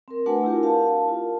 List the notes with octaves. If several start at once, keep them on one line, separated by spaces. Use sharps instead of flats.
C4 A#4
A3 D4 F#4 B4 F#5 G#5
E4 F4 G4 A#4
A#4 F5 A5
F4